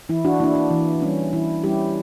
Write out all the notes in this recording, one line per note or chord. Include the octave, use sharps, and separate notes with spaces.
E3 E4
D4 F#4
A#3 D4 E4
D4
E3
G3 C#4
E3 E4
G3 C#4 E4 G4